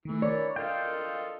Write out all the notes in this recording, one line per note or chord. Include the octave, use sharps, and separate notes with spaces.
D#3 E3 A3
D4 A#4 C#5 D5
F4 A4 D#5 F5 G5